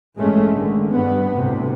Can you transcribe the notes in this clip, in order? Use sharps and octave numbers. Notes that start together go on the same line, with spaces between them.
A1 G2 G#3 A3 C#4
D3 D#3
G2 B3
D2 A2 C3